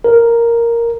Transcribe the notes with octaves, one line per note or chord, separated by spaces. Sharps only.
A#4